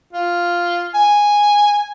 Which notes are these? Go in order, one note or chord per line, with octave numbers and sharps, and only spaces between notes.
F4
G#5